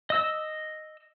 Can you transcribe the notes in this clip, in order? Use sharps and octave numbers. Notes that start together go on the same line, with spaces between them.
D#5 E6